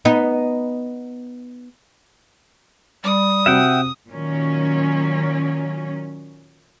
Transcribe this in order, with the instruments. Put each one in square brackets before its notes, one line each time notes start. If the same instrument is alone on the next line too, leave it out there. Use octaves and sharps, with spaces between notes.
[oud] B3 D#4
[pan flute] G3 [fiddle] D#6
[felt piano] C3 C4 F#4 [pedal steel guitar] E5 F#5 G5
[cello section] A#2 D#3 F#3 C#4